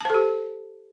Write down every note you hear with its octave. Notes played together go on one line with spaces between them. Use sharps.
G4 A4 C5 A5